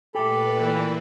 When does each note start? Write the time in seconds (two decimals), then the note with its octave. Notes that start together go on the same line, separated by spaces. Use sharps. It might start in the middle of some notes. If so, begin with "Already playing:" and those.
0.15 A#2 A3 G4 A4 B4 D5 B5
0.61 E3 A#3